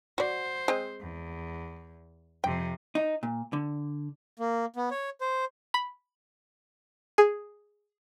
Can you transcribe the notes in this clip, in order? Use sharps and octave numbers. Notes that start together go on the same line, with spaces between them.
F#4 C5 D5
G#3 C4 D#5
E2
F2 C3 G5
D#4
A#2
D3
A#3
B3
C#5
C5
B5
G#4